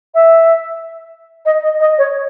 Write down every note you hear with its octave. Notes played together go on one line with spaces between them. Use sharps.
E5
D#5
D#5
D#5
C#5